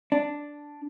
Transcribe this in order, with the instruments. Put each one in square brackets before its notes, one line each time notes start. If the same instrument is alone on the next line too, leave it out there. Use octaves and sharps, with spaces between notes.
[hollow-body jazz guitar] D4